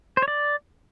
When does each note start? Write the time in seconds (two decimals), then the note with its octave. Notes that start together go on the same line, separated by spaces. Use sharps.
0.17 C5
0.22 C#5
0.28 D5